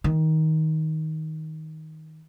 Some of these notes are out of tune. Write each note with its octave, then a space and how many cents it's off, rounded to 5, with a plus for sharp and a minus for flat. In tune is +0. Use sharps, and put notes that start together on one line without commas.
D#3 +15